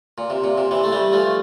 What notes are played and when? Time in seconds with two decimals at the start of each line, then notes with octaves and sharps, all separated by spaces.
0.18 A#2
0.30 C3
0.44 A#2
0.58 C3
0.71 C3 E3
0.84 A3
0.92 E3 G3
1.12 F3 A3